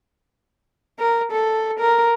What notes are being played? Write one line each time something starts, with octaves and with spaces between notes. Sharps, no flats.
A#4
A4
A#4